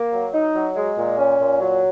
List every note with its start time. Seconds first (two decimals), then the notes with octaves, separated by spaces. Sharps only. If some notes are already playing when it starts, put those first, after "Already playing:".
Already playing: A#3
0.13 F#3
0.33 D#4
0.55 F#3
0.76 G#3
0.97 A#2
1.18 C#4
1.39 A#2
1.60 F#3